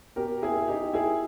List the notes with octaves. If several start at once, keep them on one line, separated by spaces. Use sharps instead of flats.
B2 G4 A#4
E4 G#4
E4
D#4 G4
E4 G#4